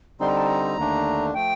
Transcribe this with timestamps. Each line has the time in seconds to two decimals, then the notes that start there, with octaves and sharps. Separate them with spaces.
0.20 D3 G3 C4 D#4 C6
0.29 A#5
0.37 A5
0.47 A#5
0.77 D#2 D3 A3 D4
1.34 F3 A3 G5